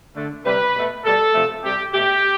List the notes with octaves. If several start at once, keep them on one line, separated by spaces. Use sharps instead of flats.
D3 A3
C3 G3 B4
B2 A3
B2 G3 A4
C3 F3 A3
C3 G3 G4
B2 A3 G4